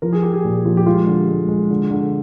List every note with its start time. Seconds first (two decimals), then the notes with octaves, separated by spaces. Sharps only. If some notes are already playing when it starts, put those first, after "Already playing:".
0.02 F3 A#4
0.13 G#4
0.23 F3 G4
0.33 G#4
0.44 A#2
0.65 F3
0.77 G4
0.86 G#3 F4
1.07 D3
1.28 G#3
1.49 G#3
1.70 D3
1.91 D3